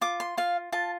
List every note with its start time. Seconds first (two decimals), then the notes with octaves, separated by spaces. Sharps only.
0.01 F4 D6
0.20 C6
0.37 F4 F5
0.72 F4 A5